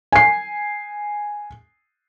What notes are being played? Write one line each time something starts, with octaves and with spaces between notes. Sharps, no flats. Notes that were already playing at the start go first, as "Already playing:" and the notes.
G#5 C7